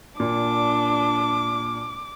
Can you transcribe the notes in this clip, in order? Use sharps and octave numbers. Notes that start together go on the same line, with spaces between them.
A#2 D4 D6